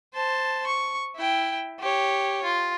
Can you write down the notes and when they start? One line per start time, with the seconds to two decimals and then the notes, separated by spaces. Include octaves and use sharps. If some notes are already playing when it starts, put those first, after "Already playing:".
0.14 C5 A5
0.67 C#6
1.16 E4 G5
1.80 G4 C#5
2.44 F4